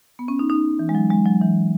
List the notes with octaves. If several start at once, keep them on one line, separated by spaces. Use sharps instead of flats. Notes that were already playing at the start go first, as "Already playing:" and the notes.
B3
C#4
D#4
D#4
E3
G#3
F#3
G#3
F#3
E3